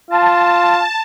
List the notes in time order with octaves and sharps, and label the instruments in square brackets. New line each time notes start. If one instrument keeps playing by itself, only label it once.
[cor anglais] F4 [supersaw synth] A5